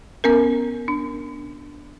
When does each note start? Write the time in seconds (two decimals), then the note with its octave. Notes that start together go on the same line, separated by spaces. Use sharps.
0.24 B3 C#4 A#4
0.88 D4